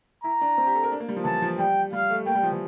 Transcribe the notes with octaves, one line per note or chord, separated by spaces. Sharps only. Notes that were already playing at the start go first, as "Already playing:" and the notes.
E4 A#5
D4
C4
G4
A4
A#4
D4
A#3
G3
F3
E3 A5
F3
G3 G5
G3 F5
A3
A#3 G5
G3
F3
E3